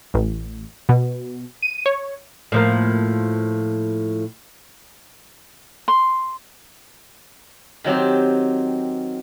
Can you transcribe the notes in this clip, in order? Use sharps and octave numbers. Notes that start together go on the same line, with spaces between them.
A1
B2
D#7
C#5
A2 F3 A#3
C6
D#3 F#3 C4 G4